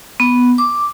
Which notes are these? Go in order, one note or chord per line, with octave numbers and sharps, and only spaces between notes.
B3
D6